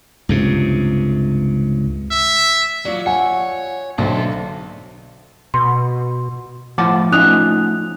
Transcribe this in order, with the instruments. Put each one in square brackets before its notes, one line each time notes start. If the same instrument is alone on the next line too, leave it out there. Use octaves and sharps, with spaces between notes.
[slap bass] C#2 G2 C3
[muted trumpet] E5
[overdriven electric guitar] F#3 [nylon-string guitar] F4 D5
[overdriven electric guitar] C#5 [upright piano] F#5 G#5
[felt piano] B1 [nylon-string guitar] D3 C5 [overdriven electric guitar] G#4 E5
[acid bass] B2 [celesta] C6
[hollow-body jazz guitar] A2 F#5 A5 [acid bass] F3 [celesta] D6
[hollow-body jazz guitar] A3 C#4 D#4 [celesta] D#6 F#6 F7